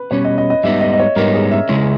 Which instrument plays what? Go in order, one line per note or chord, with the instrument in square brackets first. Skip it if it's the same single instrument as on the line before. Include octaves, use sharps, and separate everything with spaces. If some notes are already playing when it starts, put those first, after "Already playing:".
Already playing: [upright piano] B4
[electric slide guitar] B2 G3 C#4 [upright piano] C#5
[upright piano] D#5
D#5
D#5
[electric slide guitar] G#2 G3 B3 D#4 [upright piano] E5
[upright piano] D#5
D#5
C#5
[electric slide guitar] G#2 G3 B3 D#4 [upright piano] A#4
[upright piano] G#4
E5
[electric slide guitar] C#3 G#3 C#4 E4